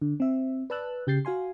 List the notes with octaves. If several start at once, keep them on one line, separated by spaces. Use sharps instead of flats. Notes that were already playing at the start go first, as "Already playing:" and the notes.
D3
C4 E5
B4 D5 A5 E6 F#6
C#3 G4 G6 A6 C7
F#4 F5 G#5 C6